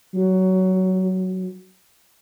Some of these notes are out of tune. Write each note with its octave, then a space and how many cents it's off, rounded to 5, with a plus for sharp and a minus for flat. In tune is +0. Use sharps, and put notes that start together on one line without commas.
F#3 +15